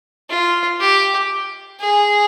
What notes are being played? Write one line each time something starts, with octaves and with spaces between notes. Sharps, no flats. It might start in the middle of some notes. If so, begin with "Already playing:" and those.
F4
G4
G#4